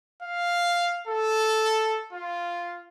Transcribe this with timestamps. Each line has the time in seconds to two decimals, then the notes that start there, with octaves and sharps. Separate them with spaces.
0.22 F5
1.08 A4
2.12 F4